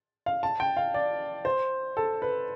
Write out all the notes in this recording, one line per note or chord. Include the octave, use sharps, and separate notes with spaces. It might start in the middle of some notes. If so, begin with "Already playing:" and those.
F5
A5
G5
F5
D5
C5
A4
B4